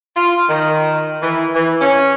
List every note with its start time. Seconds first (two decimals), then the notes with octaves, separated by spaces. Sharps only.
0.15 F4
0.48 D#3
1.22 E3
1.55 E3
1.81 C#4